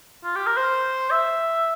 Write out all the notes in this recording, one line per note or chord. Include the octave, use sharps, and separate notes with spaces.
F4
G4
A#4
C5
E5